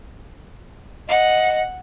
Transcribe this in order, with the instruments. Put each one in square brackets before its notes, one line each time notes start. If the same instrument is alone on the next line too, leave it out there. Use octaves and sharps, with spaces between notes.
[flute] D#5 [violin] F#5